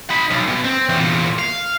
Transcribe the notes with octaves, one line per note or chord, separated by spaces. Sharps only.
D#4 B5
B1
B2
C4
E2 A#2
F5